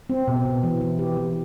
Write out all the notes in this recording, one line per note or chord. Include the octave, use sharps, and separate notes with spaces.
C4
B2
B2
E3
E3
G4
E3